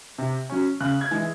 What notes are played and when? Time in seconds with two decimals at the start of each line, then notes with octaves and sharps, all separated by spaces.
0.18 C3
0.50 F#3 C#4
0.81 C#3 F#6
1.01 G#6
1.11 E3 G#3